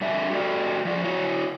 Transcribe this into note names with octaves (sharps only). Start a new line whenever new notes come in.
D3 G3 D4 E5
F#4 G4 A4 D5
F3 F4 D5
E4 F#4 C#5